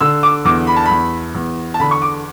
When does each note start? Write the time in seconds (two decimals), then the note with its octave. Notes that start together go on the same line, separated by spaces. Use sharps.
0.01 D3 E6
0.23 D6
0.45 E2 D6
0.67 B5
0.77 A5
0.85 E2 B5
1.35 E2
1.74 A5
1.80 D3 B5
1.91 C#6
2.02 D6